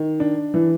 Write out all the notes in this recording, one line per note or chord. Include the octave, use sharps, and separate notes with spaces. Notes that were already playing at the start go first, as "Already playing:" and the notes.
Already playing: D#3
D4
E3